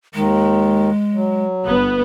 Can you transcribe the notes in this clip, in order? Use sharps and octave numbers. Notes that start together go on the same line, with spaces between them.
D#2 D#3 G#3
F#3
G1 B3